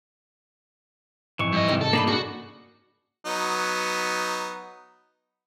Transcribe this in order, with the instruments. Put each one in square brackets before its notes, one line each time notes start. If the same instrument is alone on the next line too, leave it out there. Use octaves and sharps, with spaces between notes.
[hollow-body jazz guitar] F2 [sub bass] G#2 [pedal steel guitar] E3 C#6
[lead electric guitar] G2 D#5
[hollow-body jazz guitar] C3 D#3 D#4
[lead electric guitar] A4
[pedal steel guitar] A#3 D4 D#4 [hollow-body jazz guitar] G#4 A5 B5
[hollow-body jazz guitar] C#3 [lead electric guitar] F#4
[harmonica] F#3 B3 D#4